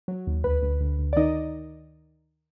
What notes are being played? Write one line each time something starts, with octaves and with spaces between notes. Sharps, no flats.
F#3
D#2
D2 B4
D2
D2
D2
D5
D#3 D#4 D#5